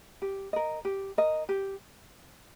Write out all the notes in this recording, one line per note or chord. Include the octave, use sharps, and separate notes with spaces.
G4
A#4 D#5
G4
A#4 D#5
G4